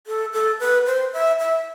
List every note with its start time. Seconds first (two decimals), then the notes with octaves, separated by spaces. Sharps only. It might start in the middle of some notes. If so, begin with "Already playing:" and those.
0.07 A4
0.33 A4
0.60 B4
0.86 C5
1.14 E5
1.40 E5